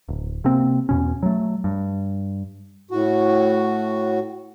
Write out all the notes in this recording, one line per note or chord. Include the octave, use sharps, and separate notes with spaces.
D1
C3 A#3 C4
E2 B2 C#4
F#3 A3
G2
A2 F#4